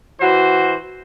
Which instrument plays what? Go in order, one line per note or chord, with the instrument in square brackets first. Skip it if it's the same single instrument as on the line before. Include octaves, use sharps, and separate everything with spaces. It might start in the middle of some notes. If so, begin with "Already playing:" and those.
[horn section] E3 F#4 C5